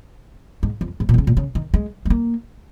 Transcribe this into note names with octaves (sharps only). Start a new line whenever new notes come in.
G#2
F2
G#2
A#2
D#3
C#3
A#2
C#3
D#3
G#3
G#3
A#3